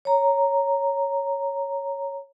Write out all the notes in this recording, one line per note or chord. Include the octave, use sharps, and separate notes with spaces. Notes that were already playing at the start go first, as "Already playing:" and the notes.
C#5 A#5